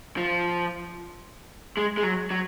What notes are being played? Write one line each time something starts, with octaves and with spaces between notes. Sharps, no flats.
F3
G#3
G#3
F#3
F#3